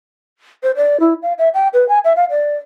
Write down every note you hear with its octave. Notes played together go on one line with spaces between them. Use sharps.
C5
D5
E4
F5
E5
G5
B4
G#5
E5
F5
D5